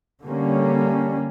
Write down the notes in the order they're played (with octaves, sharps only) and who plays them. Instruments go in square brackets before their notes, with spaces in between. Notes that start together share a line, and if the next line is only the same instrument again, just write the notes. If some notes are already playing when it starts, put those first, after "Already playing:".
[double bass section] D3 G3 A#3 C#4